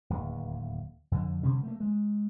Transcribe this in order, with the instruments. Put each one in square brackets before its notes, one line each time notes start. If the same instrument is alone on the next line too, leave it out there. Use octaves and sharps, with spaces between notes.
[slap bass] D1 D#2
F2 D3
B2 D3 G3 C#4
A3 A#3
G#3